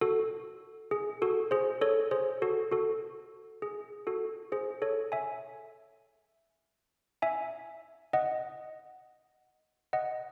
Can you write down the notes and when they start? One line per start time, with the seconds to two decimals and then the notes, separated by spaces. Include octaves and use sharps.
0.01 F#4 A4
0.91 G#4
1.22 F#4 A4
1.51 G#4 C5
1.81 A4 C#5
2.11 G#4 C5
2.42 F#4 A4
2.72 F#4 A4
3.62 G#4
4.07 F#4 A4
4.52 G#4 C5
4.82 A4 C#5
5.12 E5 G#5
7.22 E5 G#5
8.13 D#5 F#5
9.93 D#5 F#5